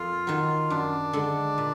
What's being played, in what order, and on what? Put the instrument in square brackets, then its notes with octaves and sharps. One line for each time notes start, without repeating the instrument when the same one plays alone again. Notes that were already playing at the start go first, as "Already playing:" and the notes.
Already playing: [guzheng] F2 A#3 [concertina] F4
[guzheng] D#3 F#3
[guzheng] F#2 [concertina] D4
[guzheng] D3 G#3
A#2